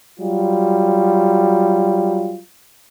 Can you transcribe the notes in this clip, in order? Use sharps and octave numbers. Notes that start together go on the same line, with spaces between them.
F#3 G3 F4